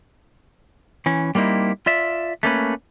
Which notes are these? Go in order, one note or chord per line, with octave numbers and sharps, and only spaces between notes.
E3 C#4
G3 A#3 C4 D#4 E4
F4 D5 E5
A3 A#3 C#4 B4